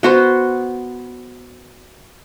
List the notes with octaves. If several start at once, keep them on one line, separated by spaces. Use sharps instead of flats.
B3 F#4 C5